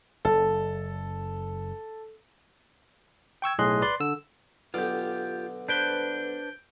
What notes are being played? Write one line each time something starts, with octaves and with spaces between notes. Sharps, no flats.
F#1 A4
G5 C#6 E6 G#6
B1 A2 G#4 D#5 C6 F#6
B4 D5 C6
D3 E6
B1 D3 F4 G4 D6
D4 B4 C5 G6 D7 G7